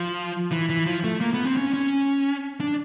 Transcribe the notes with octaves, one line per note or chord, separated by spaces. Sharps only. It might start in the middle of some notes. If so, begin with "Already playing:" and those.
Already playing: F3
E3
E3
F3
A3
A#3
B3
C4
C#4
C#4
D4